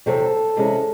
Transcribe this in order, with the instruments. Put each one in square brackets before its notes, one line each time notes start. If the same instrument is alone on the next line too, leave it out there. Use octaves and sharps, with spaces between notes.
[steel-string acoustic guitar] E2 C3 F#3 C4 A4
C3 E3 G#3 C#4 E4